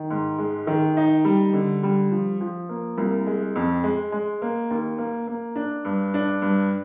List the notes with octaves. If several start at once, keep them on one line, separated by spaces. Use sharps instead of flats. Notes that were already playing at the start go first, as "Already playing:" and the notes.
Already playing: D#3
G#2
G#3
D#3
D#4
G3
D3
G3
F3
F3
A#3
C2
G#3
F2
G#3
G#3
A#3
D#2
A#3
A#3
D4
G2
D4
G2